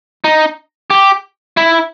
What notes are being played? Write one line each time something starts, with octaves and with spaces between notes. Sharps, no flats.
D#4
G4
E4